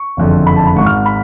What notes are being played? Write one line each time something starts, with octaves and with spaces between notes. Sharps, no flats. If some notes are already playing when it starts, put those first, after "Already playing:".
Already playing: C#6
F#1 F2 D3
B5
A5
B5
G#1 G#2 C#6
F6
B5